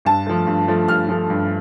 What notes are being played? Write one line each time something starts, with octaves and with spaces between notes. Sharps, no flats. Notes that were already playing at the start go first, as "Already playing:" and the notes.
G2 A5
F3 A3
G2
F3 A3
G2 F6
F3 A3
G2